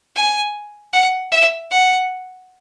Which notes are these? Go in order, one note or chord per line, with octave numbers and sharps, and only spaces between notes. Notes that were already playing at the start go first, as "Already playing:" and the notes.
G#5
F#5
E5
F#5